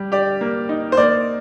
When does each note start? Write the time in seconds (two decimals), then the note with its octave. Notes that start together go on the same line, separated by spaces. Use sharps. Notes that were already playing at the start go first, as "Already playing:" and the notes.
Already playing: G3 G4
0.12 G4 D5
0.41 A#3
0.69 D#4
0.92 C5
0.97 A#3 D5